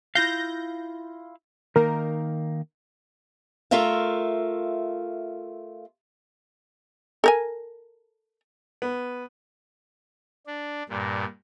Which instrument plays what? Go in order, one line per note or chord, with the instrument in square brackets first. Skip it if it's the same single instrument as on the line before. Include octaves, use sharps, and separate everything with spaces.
[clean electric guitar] E4 F4 F5 [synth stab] G6 A#6
[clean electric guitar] D#3 A#3 D#4 [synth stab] A#4
[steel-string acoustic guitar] A3 F4 A#4 E5 F5
[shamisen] A4 A#4 G#5
[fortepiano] B3
[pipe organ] D4
G2 A#2